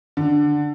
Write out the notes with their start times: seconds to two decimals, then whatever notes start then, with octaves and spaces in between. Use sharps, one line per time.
0.17 D3